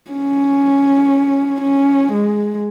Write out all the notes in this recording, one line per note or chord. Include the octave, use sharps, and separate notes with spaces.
C#4
C#4
G#3